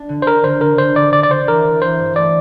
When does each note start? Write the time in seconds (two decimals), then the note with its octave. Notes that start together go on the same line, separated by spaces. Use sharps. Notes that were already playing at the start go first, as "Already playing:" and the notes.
Already playing: D4
0.09 D3
0.22 C5
0.27 D4 A#4
0.44 D3 C5
0.61 D3 A#4
0.78 D3 C5
0.96 D3 D5
1.13 D3 D5
1.23 D5
1.31 D3 C5
1.48 E3 A#4
1.65 E3
1.82 E3 C5
1.99 G2
2.16 A3 D5